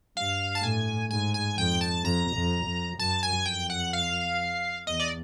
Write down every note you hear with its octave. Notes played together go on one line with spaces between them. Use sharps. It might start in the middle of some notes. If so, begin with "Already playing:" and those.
G2 F5
A5
A2 G#5
G#2 G#5
G#5
F2 G5
A5
F2 A#5
F2
F2
F#2 A5
G#5
F2 G5
F#5
F5
E2 D#5
D5